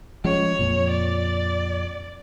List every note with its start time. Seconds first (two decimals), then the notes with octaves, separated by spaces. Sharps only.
0.24 F3 G#3 C#4 C#5
0.59 F2 A#2
0.90 D5